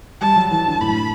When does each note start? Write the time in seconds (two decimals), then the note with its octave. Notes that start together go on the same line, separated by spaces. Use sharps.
0.21 G3 A5
0.36 F#3
0.51 E3 A5
0.66 D3
0.81 A2 B5